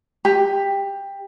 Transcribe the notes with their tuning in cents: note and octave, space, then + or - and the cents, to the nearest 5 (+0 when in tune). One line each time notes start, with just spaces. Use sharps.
G4 +15